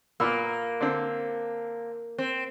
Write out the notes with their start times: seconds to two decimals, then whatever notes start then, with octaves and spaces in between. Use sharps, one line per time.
0.20 A#2 A#3 B3 E6
0.81 D3 C4
2.19 C4